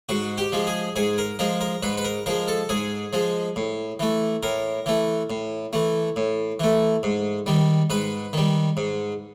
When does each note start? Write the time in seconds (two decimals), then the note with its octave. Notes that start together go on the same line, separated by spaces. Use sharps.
0.09 G#2 F#4
0.38 G4
0.52 F3 G#3
0.67 G#4
0.96 G#2 G#4
1.18 A#4
1.39 F3 G#3 A#4
1.61 A#4
1.83 G#2 B4
1.97 B4
2.04 A#4
2.26 F3 G#3 A#4
2.48 A4
2.69 G#2 G#4
3.13 F3 G#3
3.56 A2
4.00 E3 A3
4.43 A2 A#4
4.86 E3 A3
5.30 A2
5.73 E3 A3
6.16 A2
6.60 E3 A3
7.03 G#2
7.46 D#3 G3
7.90 G#2 B4
8.33 D#3 G3
8.77 G#2